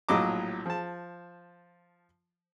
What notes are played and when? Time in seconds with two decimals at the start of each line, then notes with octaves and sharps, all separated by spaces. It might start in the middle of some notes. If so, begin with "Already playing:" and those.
0.09 A#1 A2 F#3 D#5 A#5 D6
0.66 F3 A5